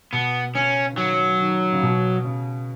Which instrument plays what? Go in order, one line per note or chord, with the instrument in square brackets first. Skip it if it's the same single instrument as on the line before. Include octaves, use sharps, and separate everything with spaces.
[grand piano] B2 [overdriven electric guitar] B3
[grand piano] C#3 [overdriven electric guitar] C#4
[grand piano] D#3
[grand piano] C#3 [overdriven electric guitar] F#3
[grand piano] D#3
C#3
B2
C#3